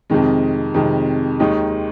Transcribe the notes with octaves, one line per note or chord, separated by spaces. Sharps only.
F2 C3 D#3 G#3
F2 C3 D#3 G#3
D#2 D#3 G#3 D#4